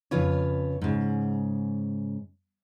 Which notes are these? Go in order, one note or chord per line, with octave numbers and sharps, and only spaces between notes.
F2 C#3 F4 B4 C#5
G#2 C#3